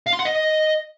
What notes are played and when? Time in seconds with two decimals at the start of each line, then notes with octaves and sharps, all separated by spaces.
0.07 F5
0.13 C6
0.19 F#5
0.25 D#5